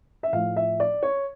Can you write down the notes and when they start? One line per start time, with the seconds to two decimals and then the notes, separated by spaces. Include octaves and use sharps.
0.23 E5
0.33 A2 F3 F5
0.56 E5
0.80 D5
1.03 C#5